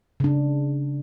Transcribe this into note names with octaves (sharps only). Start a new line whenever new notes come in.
C#3 D4